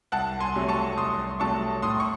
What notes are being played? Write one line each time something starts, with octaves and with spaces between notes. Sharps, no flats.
C2 F#5 A5
G#5 C6
C3 F#3 A3
A5 C#6
C2 C6 D#6
C3 F#3 A3 A5 C#6
A2 C6 D#6
C#6